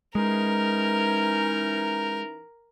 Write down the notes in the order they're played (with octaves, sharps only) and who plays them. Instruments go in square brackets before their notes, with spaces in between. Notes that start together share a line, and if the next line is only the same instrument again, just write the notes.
[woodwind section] E3 C#4 D#4 [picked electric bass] G#3 [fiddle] A#4